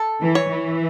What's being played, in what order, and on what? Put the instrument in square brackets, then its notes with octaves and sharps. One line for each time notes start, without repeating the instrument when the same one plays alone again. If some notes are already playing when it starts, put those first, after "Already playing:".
Already playing: [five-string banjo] A4
[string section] E3
[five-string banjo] C#5
[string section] E3